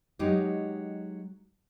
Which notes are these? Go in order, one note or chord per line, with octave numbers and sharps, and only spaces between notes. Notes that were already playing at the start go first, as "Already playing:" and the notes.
F#3 G#3 D#4 G4